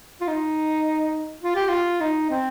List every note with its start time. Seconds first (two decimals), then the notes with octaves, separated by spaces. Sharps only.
0.21 F4
0.28 D#4
1.43 F4
1.55 G4
1.69 F4
2.01 D#4
2.30 C4